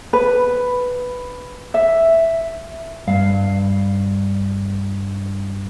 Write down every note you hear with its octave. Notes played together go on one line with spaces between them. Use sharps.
B4
E5
G2 F5